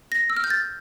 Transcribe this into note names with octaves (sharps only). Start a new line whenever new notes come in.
A#6
E6
F6
G6
A6